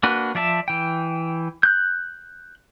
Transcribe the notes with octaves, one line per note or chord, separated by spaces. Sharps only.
A#3 D4 F#4 B4
F3 D5 E5 A5
E3 G5
F#6 G6